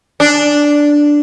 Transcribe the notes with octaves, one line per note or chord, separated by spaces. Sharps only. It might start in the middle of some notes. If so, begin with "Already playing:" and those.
D4